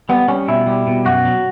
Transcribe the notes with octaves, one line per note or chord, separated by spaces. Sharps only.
G3 B3
G3 C#4
B2 E4
G3
B2
F#2 F#4
F#3